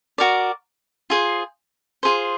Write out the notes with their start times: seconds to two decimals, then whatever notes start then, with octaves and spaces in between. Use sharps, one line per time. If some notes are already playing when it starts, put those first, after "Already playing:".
0.18 F#4 A#4 D5
1.10 F4 G#4 C5
2.03 F4 G#4 C5